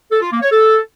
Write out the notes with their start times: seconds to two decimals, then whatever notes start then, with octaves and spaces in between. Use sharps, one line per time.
0.11 A4
0.21 F4
0.31 A#3
0.41 C#5
0.51 A4